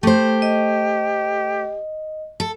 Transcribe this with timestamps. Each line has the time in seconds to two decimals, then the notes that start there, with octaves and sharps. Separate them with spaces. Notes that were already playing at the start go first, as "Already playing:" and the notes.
0.03 A3 G4 C5
0.42 D#5
2.40 A4